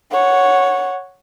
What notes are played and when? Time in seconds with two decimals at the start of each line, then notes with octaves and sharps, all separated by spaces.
0.11 C#5 F#5